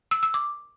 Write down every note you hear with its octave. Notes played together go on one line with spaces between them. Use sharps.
E6
E6
D6